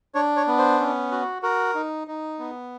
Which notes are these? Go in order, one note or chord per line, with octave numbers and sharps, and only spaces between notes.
D4 C#5
C#5
B3
C5
C#4
F#4
F#4 A#4
D#4
D#4
B3